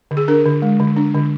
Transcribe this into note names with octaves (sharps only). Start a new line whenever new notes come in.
D3
G#4
D4 A#4
D3
G#3
D3
D4
D3